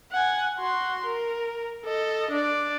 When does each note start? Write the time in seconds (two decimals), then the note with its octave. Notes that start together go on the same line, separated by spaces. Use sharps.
0.12 F#5 G#5
0.58 F#4 C6
1.05 A#4
1.85 A4 D#5
2.31 D4 D5